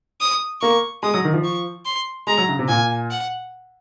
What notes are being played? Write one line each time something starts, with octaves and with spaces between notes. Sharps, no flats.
D#6
A#3 C#6
G#3 D#6
F#3
D#3
F3
C#6
C6
G#3 A#5
F#3
C#3
C3
A#2 G#5
F#5